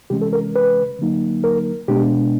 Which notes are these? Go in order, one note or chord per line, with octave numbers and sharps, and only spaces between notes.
C3 E3 G#3 C#4 G4
A4
A#4
B4
D3 F#3 A#3 D#4
A#4
B2 G#3 B3 D4 G4